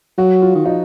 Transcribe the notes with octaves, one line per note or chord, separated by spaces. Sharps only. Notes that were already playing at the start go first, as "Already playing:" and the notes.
F#3 F#4
F4
D#3
F3 D#4